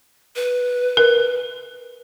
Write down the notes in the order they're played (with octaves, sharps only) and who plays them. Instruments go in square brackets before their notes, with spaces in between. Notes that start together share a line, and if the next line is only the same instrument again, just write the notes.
[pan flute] B4
[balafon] A#4